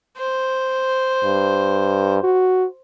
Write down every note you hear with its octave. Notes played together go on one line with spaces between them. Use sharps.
C5
G2
F#4